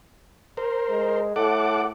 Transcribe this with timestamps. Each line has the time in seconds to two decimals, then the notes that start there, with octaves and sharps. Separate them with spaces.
0.57 A#4 C5
0.89 G#3
1.36 A2 A4 F#5 D6